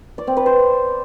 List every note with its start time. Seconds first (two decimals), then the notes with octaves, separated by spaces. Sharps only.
0.18 D5
0.27 C4
0.37 B4
0.46 C5